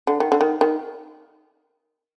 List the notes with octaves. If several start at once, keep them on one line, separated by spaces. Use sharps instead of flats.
D3
D#3
D3
D#3
D#3